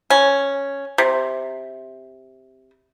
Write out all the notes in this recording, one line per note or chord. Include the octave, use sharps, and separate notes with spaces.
C#4
C3